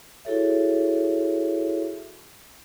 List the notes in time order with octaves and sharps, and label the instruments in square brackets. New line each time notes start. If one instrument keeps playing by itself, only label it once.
[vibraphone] E4 F#4 G#4 A4 C#5 E5